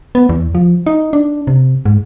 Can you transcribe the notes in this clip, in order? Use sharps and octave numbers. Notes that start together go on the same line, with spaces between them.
B3
E2
F3
D#4
D4
C3
G#2